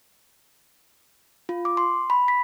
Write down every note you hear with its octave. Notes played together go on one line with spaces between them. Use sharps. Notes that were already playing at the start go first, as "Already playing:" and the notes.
F4
D6
C6
B5
B6